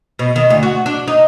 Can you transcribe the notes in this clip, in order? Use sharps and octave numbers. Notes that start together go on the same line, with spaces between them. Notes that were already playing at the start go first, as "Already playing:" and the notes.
B2
D#3
D2
F#4
D4
D#4